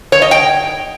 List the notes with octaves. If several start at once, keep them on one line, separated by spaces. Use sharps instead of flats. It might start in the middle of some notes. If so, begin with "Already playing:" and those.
C#5
D#5
G5